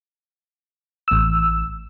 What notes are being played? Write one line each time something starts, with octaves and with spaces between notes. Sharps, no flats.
A1 E6